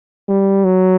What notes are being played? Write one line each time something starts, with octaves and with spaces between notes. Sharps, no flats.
G3
F#3